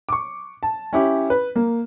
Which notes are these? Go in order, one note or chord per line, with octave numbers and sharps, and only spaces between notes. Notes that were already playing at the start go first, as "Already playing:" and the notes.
C#6 D6
A5
C#4 E4 G4
B4
A#3